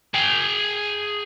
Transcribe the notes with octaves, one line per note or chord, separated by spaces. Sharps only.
G#4 G5